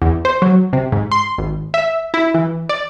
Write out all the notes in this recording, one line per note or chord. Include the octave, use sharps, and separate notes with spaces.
E2
C5
F#3
C3
G#2
C6
G#1
E5
E4
E3
D5